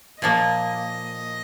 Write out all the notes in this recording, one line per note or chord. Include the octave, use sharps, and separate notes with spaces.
A#2 F3 A#3 D#5